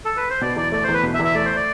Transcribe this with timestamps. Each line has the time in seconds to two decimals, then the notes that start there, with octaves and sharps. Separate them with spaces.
0.05 A4
0.17 B4
0.30 C5
0.41 B2 D5
0.56 E2 D5
0.72 A3 D5
0.83 E2 C5
0.94 B4
1.03 B2
1.14 E5
1.19 E2
1.24 E5
1.35 A3 D5
1.45 C5
1.56 D5